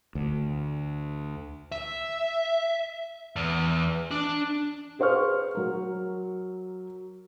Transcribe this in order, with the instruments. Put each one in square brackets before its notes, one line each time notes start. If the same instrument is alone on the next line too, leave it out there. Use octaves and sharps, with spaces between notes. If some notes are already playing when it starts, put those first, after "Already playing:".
[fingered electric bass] D2
[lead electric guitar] E5
E2
D4
[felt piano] G#4 B4 C5 F5 C#6 F6
F#3 A#4